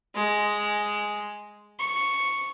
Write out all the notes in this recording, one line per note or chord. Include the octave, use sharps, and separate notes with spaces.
G#3
C#6